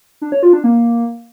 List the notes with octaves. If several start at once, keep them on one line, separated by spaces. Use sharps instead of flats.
D4
C#5
F4
D4
A#3